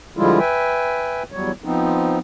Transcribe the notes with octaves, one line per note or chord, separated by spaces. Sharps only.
D3 F3 G3 G#3 E4 F4
B4 E5 G5 G#5
E2 F#3 G3 C#5
F3 B3 C4 D#4